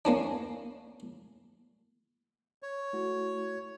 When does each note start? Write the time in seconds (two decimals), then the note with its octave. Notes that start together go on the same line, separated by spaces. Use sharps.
0.05 A#3 C#4 D4
2.63 C#5
2.93 A3 E4 F#4